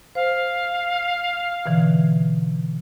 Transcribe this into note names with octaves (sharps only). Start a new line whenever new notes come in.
C5 F5
B2 D3 E3